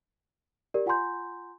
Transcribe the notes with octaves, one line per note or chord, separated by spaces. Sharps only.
G4 A#4 D5
F4 F#5 G#5 A#5 C6 G6